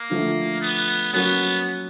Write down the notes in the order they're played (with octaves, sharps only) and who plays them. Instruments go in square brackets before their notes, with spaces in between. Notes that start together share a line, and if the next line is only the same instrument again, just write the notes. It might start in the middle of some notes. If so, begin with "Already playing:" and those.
Already playing: [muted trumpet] A#3
[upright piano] D3 F3 A3
[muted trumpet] B3
[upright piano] F#3 A#3 C#4 F#4 [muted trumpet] B3